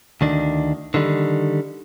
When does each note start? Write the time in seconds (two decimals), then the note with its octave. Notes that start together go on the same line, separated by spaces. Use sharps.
0.21 D2 D#3 D4
0.94 D3 D#3 G3